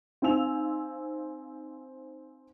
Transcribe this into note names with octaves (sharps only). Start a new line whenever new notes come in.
C4 D#4 F5 G#5 E6 F7